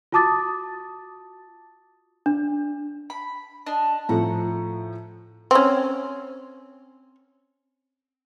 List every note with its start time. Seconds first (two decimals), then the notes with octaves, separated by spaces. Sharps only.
0.12 F4 F#4 A5 D6 D#6 A6
2.26 D4
3.10 B5
3.66 D4 D#5 A5
4.09 A2 F3 A3 F#5 A#5
5.51 C4 C#4